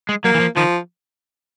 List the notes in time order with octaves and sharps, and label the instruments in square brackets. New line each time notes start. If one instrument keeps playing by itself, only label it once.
[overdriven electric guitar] G#3
[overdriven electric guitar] F#3 [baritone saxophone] A#3
[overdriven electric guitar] E3
F3
[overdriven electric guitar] D#3 [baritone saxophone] F3